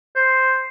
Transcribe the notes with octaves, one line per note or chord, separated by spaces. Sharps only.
C5